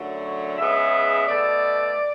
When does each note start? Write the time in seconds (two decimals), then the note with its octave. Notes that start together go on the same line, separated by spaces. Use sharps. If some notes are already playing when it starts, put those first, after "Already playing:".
Already playing: F#2 D3 F#3 A3
0.24 C#5
0.58 C#3 G#3 B3 E5
1.27 B2 A3 D5